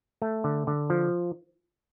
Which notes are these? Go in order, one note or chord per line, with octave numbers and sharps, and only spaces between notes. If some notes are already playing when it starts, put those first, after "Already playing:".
A3
D3
D3
F3